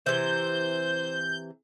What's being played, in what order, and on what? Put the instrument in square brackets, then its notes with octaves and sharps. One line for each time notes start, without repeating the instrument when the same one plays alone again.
[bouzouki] C3 E3 [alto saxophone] C5 [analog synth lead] G6